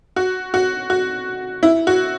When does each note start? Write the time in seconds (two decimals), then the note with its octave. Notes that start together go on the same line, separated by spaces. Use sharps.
0.16 F#4
0.54 F#4
0.90 F#4
1.63 E4
1.87 F#4